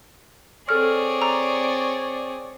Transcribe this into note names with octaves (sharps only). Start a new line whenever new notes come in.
C4 G#4 A4 C#5 D5 F6
A#5